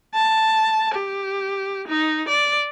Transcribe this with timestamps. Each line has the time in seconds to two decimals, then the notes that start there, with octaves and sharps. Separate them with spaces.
0.14 A5
0.94 G4
1.88 D#4
2.29 D5